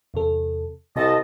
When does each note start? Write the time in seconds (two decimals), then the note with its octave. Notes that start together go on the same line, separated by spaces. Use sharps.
0.14 E2 C3 A4
0.96 C2 C3 D#5 A5